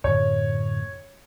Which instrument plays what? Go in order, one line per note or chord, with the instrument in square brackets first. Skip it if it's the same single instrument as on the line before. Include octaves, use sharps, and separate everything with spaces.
[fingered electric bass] F#2 A2 D3 [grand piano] C#5